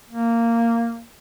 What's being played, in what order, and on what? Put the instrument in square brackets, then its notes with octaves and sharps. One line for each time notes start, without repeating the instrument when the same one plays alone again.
[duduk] A#3